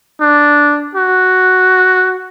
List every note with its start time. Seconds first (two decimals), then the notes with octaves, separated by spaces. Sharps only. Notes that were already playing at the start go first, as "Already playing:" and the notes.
0.21 D4
0.95 F#4